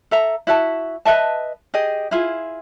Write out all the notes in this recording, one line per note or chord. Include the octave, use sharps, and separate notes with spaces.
A4 E5 A#5
E4 F#4 E5 A5
B4 D#5 E5 A5
G4 G#4 D#5
E4 F4 G#4